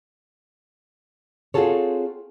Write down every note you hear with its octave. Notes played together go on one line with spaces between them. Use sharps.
C4 F4 F#4 G#4 A4 C#5